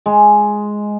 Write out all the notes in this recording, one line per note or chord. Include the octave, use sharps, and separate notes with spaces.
G#3